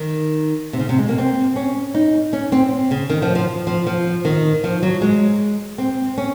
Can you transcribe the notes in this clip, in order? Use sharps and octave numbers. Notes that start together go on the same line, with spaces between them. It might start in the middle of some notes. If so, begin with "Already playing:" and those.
Already playing: D#3
C3
C#3
C3
G#3
A#3
C4
C#4
D#4
C#4
C4
C#3
D#3
F3
F3
F3
F3
D#3
F3
F#3
G#3
C4
C#4